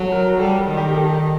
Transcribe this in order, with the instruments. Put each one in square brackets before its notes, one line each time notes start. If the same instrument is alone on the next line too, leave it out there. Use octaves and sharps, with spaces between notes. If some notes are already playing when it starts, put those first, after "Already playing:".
Already playing: [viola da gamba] F#3 [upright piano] A4
[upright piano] A#4
[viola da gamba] G3 [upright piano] A4
[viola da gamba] D#3
[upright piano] G4
G4
A4